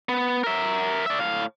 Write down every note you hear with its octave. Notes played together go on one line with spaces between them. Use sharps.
B3
A#4 E5
D5 E5
A2 F5